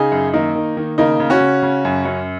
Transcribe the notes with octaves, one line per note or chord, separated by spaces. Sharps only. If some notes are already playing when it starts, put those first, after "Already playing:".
Already playing: C#3 D#4 G#4
F#2
D#3 A#3 D#4
D#3
D#3
C#3 A#3 D#4
C#3
C#4 F#4
C#3
C#3
F#2
F#2